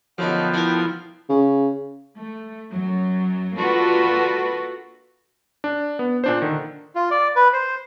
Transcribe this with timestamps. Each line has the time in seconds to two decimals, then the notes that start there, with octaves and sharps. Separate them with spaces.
0.18 F#2 D3 F3 B3 D#4 A4 G5
0.54 D4 E4 A#4
1.29 C#3
2.18 A3
2.70 F#2 F#3
3.57 A#3 D4 F4 F#4 A4 B4
5.64 D4
5.99 B3
6.24 A#2 D4 C5
6.42 D3 D#3
6.95 F4
7.11 D5
7.36 B4
7.53 C5